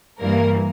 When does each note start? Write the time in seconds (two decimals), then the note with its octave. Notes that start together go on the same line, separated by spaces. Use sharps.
0.19 G2 E3 G3 A#3 A#4